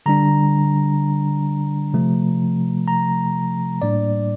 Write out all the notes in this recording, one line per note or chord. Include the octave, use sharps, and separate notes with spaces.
D3 G3 D4 A#5
C3 F3 A3
A#5
A2 G3 A#3 D4 D5